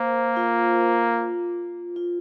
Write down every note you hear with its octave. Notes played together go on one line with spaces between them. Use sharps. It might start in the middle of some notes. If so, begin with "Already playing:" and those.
Already playing: A#3 A#4 C5
F4
F4